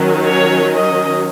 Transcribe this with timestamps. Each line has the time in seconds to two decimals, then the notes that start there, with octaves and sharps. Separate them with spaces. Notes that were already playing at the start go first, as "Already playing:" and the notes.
Already playing: D#3 F#3 C#4
0.27 C#5
0.74 D#5